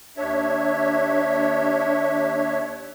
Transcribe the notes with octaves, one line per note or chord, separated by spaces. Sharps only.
D#2 D4 C#5 E5